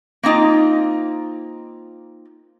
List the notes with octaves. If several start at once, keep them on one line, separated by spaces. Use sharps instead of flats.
A#3 C4 D#4 F4